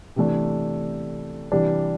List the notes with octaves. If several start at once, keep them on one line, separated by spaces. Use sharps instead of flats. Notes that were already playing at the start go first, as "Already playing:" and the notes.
C3 E3 A3 D4
C3 E3 G3 D4